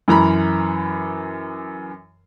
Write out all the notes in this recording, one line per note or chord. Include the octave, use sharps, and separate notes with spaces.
F#2 E3 A#5 B5